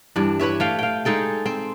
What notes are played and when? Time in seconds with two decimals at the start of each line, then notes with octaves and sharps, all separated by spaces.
0.16 G2 E3 D4
0.40 E4 B4 C#5 E5
0.60 A3 F5 G5
0.79 F5 G5
1.05 G#3 D#4 A4 G5
1.46 C4